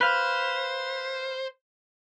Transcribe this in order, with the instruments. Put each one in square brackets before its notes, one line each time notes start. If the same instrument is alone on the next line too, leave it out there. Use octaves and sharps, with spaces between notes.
[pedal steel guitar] B4 F5 [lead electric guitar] C5